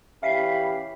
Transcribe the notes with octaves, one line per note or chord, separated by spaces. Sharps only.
E3 C#4 G4 E5 F5 B5 B6 C7